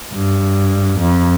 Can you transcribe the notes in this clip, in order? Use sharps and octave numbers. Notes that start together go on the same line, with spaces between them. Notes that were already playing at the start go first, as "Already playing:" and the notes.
G2
F2